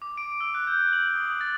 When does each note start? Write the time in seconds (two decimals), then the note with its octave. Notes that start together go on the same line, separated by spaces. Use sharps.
0.02 D6
0.17 D7
0.41 E6
0.55 F#6
0.67 G6
0.93 F#7
1.16 D#6
1.41 A6